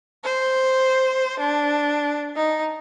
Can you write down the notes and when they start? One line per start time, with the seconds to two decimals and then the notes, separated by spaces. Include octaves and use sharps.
0.24 C5
1.40 D4
2.36 D#4